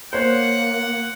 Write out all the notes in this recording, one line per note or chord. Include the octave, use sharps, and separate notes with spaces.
A#3 C5 C#5 F#5